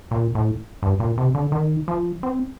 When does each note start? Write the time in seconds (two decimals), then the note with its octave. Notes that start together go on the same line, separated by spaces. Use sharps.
0.11 A#2
0.35 A2
0.83 G2
1.00 A#2
1.18 C3
1.35 D3
1.52 D#3
1.88 F3
2.23 C4